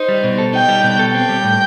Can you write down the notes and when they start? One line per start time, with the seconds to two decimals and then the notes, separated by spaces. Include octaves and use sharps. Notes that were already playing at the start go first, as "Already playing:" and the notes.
Already playing: D#4 C5
0.09 G3
0.24 B2
0.38 A4
0.53 D#4 G5
0.68 G3
0.84 B2
0.99 A4
1.13 C4 G5
1.29 G3
1.44 A2